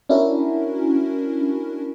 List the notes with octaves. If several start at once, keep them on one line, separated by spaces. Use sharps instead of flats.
C#4 D4 E4 F#4 A#4